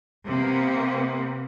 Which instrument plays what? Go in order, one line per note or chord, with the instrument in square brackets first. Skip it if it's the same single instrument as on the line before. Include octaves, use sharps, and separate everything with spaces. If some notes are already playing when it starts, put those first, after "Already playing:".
[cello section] C3 A#3 B3